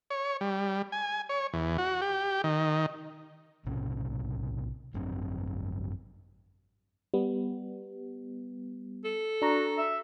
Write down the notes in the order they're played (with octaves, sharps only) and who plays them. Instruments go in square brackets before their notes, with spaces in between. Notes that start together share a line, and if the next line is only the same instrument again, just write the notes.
[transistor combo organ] C#5
G3
G#5
C#5
E2
F#4
G4
D#3
[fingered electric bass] B1 A2 C3 C#4
G#1 F#2 C4 D4
[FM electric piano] G3 B3
[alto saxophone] A4
[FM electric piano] D4 A#5 [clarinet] F#4
[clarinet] E5